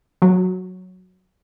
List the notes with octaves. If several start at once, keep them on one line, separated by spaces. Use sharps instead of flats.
F#3